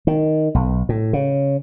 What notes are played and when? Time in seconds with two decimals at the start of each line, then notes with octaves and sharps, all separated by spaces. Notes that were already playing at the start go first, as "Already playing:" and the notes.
0.07 D#3
0.54 B1
0.89 A2
1.13 C#3